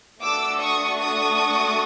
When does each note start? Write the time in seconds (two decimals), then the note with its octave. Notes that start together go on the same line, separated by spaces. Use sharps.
0.21 A3 D4 F#4 A4 D6 E6
0.60 C#6 D#6
0.99 C#6 D#6